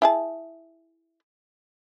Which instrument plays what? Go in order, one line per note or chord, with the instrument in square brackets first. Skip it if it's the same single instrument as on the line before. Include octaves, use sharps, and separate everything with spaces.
[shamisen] E4 G#4 A5